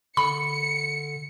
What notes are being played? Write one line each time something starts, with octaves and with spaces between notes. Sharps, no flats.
D3 B5 C#7